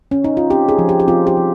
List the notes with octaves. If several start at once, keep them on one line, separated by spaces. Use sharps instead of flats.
C#4
D#4
F4
C4 G4
G#4
F3
G4
G4
C4 F4
G4
F3